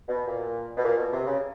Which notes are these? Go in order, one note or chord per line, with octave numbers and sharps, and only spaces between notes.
B2
A#2
B2
A#2
B2
C3
C#3